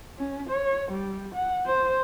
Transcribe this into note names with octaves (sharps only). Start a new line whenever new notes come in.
C#4
C#5
G3
F#5
C5